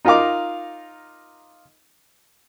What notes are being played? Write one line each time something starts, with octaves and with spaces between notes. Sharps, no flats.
D#4 F4 A#4 F5 D6